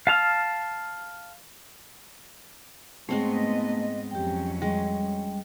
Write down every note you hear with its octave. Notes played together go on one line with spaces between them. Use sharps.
F5 A5 F6
G#2 G#3 A3 B3 C4 C#5 D#5
F2 F#3 C#4 G4 G5
G3 G#3